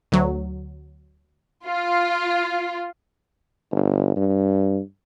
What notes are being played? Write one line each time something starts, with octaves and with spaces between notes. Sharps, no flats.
D2 F#3
F4
G1
G2